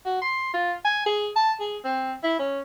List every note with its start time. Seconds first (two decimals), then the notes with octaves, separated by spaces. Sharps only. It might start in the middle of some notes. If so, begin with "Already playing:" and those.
0.05 F#4
0.22 C6
0.54 F4
0.85 G#5
1.06 G#4
1.36 A5
1.60 G#4
1.85 C4
2.24 E4
2.39 C#4